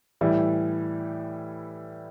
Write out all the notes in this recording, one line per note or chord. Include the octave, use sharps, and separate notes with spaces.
A2 E3 G3